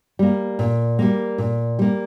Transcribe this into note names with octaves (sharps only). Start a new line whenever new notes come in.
G3 A#3
A#2
G3 A#3
A#2
G3 A#3